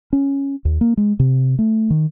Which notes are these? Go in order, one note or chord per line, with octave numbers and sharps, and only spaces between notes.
C#4
D#2
A#3
G#3
C3
A3
D#3